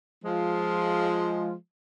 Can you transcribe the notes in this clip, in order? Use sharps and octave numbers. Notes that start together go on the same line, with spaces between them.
F3 G#3 F4